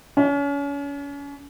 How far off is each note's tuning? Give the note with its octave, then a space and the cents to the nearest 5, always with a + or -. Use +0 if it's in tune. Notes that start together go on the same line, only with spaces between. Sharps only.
C#4 +35